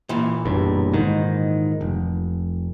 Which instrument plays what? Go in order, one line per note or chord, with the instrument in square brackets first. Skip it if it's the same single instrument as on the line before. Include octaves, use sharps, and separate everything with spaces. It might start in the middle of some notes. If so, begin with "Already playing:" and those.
[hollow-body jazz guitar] A#2 E3
[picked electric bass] F#1 B1 G2
G#2 D#3
F1